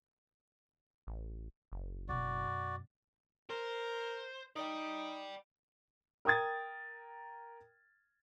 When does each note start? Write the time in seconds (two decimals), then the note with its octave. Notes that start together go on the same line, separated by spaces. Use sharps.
1.07 A1
1.72 F#1
2.09 F#2 B2 F#4 D5
3.50 A#4 C5
4.56 D#4 D5 G5
6.25 A#4 G5 D#6 G#6 A6